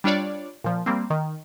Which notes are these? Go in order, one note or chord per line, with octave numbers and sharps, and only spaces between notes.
G3 D4 F4 C#5 D5
A#2 F3
G3 A#3 C4
D#3